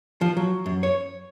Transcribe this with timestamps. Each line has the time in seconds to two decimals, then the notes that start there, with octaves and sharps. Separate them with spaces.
0.21 F3
0.37 F#3
0.66 F#2
0.83 C#5